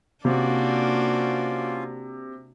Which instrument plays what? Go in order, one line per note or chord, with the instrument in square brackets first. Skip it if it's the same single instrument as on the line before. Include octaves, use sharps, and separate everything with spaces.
[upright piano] C3 [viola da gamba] A#3 D4 [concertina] C#4 F4 F5 [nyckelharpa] F#4 D5